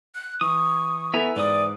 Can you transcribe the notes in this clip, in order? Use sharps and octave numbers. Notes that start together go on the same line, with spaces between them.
F#6
E3 C#6 D#6
B3 E4 A4 E5 G#5 A#5
G#2 E3 B4 D5 D#6